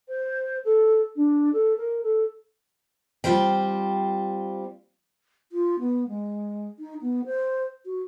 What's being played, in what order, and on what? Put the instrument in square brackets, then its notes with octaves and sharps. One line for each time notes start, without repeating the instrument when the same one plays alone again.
[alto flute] C5
A4
D4
A4
A#4
A4
[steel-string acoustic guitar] G3 C4 F4 C5 G5
[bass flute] F4
B3
G#3
D#4
B3
C5
F#4